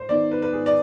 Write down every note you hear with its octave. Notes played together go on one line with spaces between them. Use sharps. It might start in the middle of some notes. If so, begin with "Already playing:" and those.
Already playing: G#2 C5
D#3 B3 D#4 D5
B4
B4
G#2 G#4
D5